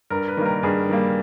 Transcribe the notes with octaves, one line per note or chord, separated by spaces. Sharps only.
G2 A#4
B4
D#3 G3 A#3
A#4
G2 G#4
D#3 G3 A#3